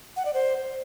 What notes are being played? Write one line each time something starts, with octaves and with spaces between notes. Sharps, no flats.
F#5
D5
C5